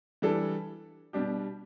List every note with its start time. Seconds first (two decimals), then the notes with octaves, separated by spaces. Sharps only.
0.22 E3 G3 D4 A4
1.13 B2 G3 D4 G4